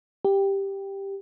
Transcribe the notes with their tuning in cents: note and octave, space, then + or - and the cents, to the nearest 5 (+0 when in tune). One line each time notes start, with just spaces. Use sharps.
G4 +5